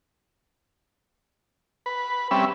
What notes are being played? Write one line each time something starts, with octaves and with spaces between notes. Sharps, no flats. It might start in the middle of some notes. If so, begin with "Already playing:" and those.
B4
G3 C4 C#4 B4 E5